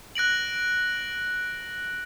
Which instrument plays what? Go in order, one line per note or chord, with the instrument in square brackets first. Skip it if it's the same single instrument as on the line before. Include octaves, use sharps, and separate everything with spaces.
[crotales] F#6 A#6 D7 F#7